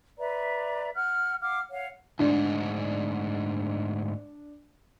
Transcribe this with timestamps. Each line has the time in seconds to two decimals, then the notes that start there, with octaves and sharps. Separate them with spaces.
0.18 B4 D5 E5 A#5
0.95 F#5 F6 F#6
1.41 F5 F#5 D6 F6
1.71 C#5 F5 F#5
2.19 D2 G#2 D4